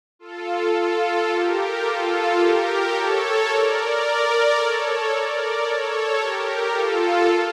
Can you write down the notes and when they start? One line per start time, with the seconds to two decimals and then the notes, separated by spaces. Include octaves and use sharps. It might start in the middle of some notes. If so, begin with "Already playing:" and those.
0.19 F4 A4
0.74 F4 A4
1.29 G4 A#4
1.83 F4 A4
2.37 G4 A#4
2.92 A4 C#5
3.46 A#4 D5
4.55 A4 C#5
5.09 A#4 D5
5.64 A4 C#5
6.18 G4 A#4
6.72 F4 A4